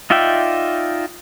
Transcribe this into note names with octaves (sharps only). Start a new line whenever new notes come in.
D#4 F4 D5 E5 G5